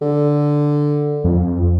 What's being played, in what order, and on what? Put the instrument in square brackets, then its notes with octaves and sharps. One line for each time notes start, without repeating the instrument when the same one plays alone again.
[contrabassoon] D3
[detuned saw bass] F2